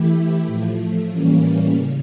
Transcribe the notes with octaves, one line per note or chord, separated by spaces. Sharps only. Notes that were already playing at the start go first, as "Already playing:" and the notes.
Already playing: E3 A3 E4 G4
A2 F3 A3
A2 E3 G3 A#3 C#4
C#3